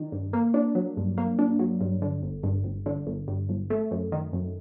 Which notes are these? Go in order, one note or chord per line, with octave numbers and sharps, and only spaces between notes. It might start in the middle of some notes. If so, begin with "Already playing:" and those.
Already playing: D#3 D4
G2
A#3
D4
F#3
G2
A#3
D4
F#3
G2
D3
G1
G2
G1
D3
G1
G2
G1
A3
F#2
D#3
F#2